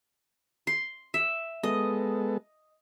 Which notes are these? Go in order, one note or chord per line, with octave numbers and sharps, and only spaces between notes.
C6
E5
G#3 B3 A4 D#5